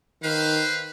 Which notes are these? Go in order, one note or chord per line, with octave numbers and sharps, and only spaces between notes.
D#3 B4 C5 F5